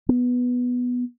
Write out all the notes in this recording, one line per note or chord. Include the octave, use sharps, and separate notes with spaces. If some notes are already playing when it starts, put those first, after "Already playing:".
B3